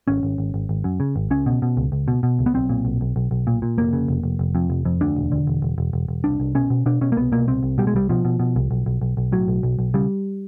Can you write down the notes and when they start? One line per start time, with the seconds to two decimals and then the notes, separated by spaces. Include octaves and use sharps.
0.08 G#1 C#4
0.23 G#1
0.38 G#1
0.54 G#1
0.69 G#1
0.84 F#2
1.00 C#3
1.16 G#1
1.31 C#2 C#4
1.46 B2
1.62 B2
1.77 C#2
1.92 C#2
2.08 B2
2.23 B2
2.39 C#2
2.46 B3
2.54 B1 C4
2.69 A#2
2.85 B1
3.01 B1
3.16 B1
3.31 B1
3.47 A#2
3.62 A#2
3.78 F1 A#3
3.93 C#3
4.08 F1
4.23 F1
4.39 F1
4.55 F2
4.70 F1
4.85 F2
5.01 D2 D4
5.16 E1
5.32 D3
5.47 E1
5.62 E1
5.78 E1
5.93 E1
6.08 E1
6.24 C2 D4
6.40 C2
6.55 B2 C#4
6.70 B2
6.86 B2 D4
7.01 B2 C#4
7.12 A#3
7.16 C2 B3
7.32 B2 A#3
7.47 C2 C4
7.63 C2
7.78 B2 G3
7.87 G#3
7.94 C2 G3
8.09 B2 F3
8.25 B2
8.40 B2
8.56 C2
8.71 B1
8.86 B1
9.02 B1
9.17 B1
9.32 A2 F#3
9.48 B1
9.63 B1
9.79 B1
9.94 C#3 G3